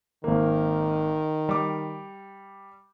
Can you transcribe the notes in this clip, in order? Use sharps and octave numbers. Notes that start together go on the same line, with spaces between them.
G#1 D#3 A#3
G3 D6